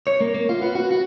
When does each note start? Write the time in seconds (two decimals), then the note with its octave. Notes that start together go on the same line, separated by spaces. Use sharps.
0.07 C#5
0.21 A#3
0.34 A#3
0.49 F4
0.62 B3
0.75 F#4
0.91 F#4